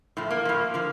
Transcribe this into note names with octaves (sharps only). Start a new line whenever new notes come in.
A2 F3
A#3
A2 F3
D3 F3